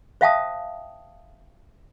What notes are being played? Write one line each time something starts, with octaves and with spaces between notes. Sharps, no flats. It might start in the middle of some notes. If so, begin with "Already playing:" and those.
C5 E5 F5 G5 A5 D#6